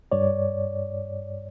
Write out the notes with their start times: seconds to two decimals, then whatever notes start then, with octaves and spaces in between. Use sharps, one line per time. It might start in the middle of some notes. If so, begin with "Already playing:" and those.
0.12 G2 C#5 D5